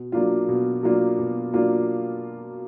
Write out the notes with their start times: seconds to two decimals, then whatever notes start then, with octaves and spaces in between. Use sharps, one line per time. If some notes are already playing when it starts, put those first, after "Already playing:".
Already playing: B2
0.12 F#3 A#3 D4 F4
0.48 B2
0.83 F#3 A#3 D4 F4
1.19 B2
1.53 F#3 A#3 D4 F4